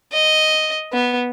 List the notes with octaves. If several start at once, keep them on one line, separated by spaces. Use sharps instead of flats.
D#5
B3